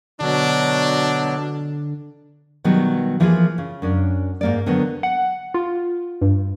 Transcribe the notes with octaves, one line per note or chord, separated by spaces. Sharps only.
B2 D3 F#3 D4
B2 D#3 F#3 G3 B3
E3 F3 A#3 E4 F4 G#4
C#3
F#2 C#4 D4
G#2 A#3 D5
D3 D#3 F#3 B3
F#5
F4
G2